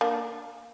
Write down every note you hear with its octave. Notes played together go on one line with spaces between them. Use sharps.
A#3 D4